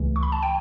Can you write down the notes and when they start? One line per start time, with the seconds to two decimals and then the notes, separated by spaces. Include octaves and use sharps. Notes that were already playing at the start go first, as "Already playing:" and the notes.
Already playing: C#2 C#3 E3 A3
0.16 C#6
0.23 B5
0.32 A5
0.43 G5